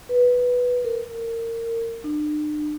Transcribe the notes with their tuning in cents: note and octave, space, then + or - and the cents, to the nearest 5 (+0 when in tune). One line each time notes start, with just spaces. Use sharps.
B4 -5
A#4 -25
D4 +45